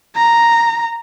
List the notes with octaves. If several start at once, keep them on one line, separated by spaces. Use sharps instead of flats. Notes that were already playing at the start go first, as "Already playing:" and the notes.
A#5